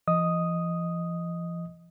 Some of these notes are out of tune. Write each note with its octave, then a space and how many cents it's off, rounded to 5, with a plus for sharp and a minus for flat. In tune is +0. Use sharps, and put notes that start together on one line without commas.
F3 -45 D#5 +0 D#6 +0